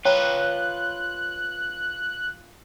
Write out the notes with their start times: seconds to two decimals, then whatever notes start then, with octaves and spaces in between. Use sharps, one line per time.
0.05 F4 B4 C#5 G5 A#5 F#6